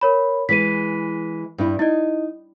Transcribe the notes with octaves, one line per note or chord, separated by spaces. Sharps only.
A#4 C#5 B5
E3 G#3 B4 B6 D#7
G2 D4 E4
D#4 E4 D#5